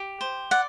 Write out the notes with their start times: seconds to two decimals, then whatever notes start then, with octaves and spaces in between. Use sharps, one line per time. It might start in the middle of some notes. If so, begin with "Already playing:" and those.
Already playing: G4
0.21 C5
0.51 D5 F#5